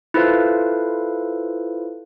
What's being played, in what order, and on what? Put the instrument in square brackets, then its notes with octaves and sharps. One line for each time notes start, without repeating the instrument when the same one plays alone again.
[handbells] E4 F4 A4 B4 C5 F5